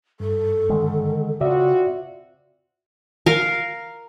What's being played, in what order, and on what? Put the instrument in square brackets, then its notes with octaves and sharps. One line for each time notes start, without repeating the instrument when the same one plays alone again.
[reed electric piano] G2 [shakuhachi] A4
[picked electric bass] D3 D#3 G#3
[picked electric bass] C#3 [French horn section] C4 F4 F#4 [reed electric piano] D5 E5
[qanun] A#4 F5